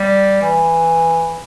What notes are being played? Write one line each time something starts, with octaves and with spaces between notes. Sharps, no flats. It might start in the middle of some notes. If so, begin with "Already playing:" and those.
Already playing: G3
E3